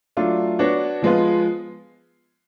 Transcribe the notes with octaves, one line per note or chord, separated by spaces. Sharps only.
F#3 A3 D4 F4
B3 D4 F#4 C#5
F3 G#3 B3 F4